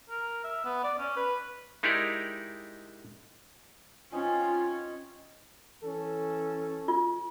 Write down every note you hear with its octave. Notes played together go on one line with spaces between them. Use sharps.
A#4
E5
B3
D5
C#4
B4
G#3 D#4 E4 G4 A#4 D5
C4 C#4 D#4 F4 G#5
E3 C#4 A4
F4